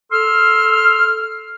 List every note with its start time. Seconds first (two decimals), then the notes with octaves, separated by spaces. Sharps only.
0.12 A4 C6 E6 F6